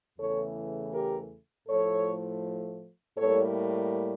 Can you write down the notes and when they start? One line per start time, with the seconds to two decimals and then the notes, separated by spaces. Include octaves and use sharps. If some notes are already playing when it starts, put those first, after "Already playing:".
0.19 E2 C#3 E3 A3 A4 C#5
0.93 G4 A#4
1.68 A2 F3 A3 A4 C#5
3.17 A2 G3 A#3 A4 C#5